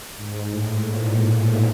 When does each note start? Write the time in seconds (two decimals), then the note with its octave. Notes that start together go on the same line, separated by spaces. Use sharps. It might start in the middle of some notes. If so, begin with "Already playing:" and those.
0.16 G#2
0.50 A2
0.84 A#2